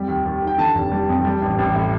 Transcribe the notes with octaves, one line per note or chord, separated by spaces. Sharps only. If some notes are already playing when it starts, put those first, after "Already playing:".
Already playing: F2 G3
D#2
D#2
D#3
G5
D3 A5
F1
G3
F2
G3
A1
A1
A2